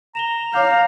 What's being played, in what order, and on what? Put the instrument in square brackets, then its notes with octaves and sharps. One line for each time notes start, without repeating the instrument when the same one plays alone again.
[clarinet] A#5 [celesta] E7 F7 G7
[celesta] C#5 D6 G6 [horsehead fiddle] F5